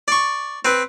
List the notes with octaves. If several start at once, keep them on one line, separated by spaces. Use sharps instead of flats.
D5 C#6
C4 B4